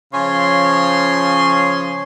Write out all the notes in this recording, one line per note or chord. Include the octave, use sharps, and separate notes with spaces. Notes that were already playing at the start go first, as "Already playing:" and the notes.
C#3 F3 C#5 G#5 C6